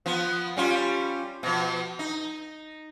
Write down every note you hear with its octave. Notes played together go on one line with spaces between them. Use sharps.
F3 B3
G3 C#4 F4
B2 F3
D#4